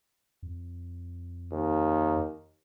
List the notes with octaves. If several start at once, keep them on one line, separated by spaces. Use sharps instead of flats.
F2
D#2